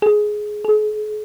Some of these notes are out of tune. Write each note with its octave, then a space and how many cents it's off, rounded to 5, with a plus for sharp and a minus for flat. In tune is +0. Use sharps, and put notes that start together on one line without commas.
G#4 +15
G#4 +45